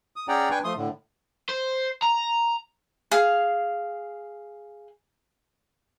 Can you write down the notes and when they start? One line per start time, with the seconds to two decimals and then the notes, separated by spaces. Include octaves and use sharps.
0.16 D#6
0.28 C#4 G#4 D5 F#5 G5 A#5
0.51 D4 B4 G5 G#5 C#6
0.64 F3 A3 C6 D#6
0.76 A2 D3
1.49 C5
2.03 A#5
3.12 G#4 F5